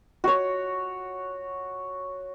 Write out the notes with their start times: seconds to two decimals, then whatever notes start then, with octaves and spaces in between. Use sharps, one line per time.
0.24 F#4 C#5